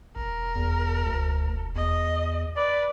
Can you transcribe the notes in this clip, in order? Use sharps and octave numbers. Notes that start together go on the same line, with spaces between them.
E1 A#4
E2
D2
E2 D#5
B4 D5